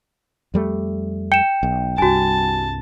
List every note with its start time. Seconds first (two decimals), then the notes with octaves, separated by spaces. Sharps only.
0.54 F2 G3 A3
1.32 G5 C#7 E7
1.63 B1
1.98 C2 G2 F#4 G#5 A5